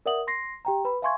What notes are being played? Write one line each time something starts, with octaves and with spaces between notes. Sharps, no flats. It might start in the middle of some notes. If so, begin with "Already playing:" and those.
A#4 D5 E5 F#5 D#6 F#7
C6 A#6 C7
G4 G5 A#5
B4 B5
E5 F5 G#5 C6 C#6 G#6